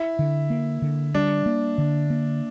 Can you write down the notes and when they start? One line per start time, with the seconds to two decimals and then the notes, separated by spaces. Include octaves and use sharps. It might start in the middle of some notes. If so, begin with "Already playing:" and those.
Already playing: E4
0.19 D3
0.50 A#3
0.82 D3
1.14 G3 D4
1.46 A#3
1.78 D3
2.10 A#3